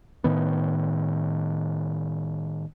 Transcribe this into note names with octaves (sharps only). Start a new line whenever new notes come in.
A2 D#3 B3